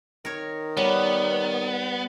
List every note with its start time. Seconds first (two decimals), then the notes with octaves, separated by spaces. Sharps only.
0.25 D#3 A#4 C#5
0.77 G3 B3 C#5